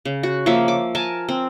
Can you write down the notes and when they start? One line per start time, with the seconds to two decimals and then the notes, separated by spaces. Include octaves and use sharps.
0.05 C#3
0.23 F#4
0.46 F3 A#3 C#5 E5
0.68 D6
0.95 A#4 G#5 A5
1.29 C4